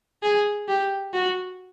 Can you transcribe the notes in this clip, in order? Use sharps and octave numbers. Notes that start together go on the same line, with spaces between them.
G#4
G4
F#4